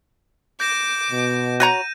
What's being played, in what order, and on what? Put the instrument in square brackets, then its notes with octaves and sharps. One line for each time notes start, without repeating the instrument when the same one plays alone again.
[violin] D6 [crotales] G6 A#6 E7
[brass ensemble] B2
[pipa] F#4 C#5 A#5 [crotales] G6 D#7